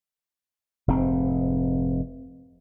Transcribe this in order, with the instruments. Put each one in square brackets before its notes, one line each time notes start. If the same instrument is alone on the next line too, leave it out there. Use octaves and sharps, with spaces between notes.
[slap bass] F1 G#2 C4